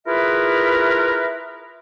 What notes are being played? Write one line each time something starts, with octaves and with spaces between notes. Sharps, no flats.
E4 F4 G#4 A#4 B4 E5